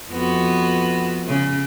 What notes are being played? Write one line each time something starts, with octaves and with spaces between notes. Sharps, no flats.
F2 B3 F#4
C#3